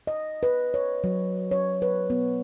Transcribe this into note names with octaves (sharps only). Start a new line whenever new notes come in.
D#5
B4
C#5
F#3
C#5
B4
B3